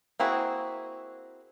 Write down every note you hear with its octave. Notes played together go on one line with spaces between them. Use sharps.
A#3 C4 E4 F#4 G#4